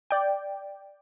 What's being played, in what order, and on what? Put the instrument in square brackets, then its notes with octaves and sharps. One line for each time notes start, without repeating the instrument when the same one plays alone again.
[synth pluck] D5 G5